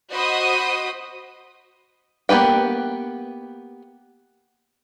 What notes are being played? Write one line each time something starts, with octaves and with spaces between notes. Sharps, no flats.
F#4 C5 D#5 B5 D#6
A#3 B3 G4 B4 G5